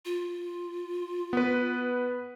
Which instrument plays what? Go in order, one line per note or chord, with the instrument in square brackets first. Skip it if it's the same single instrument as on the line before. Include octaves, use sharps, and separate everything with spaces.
[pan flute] F4
[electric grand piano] B3 B4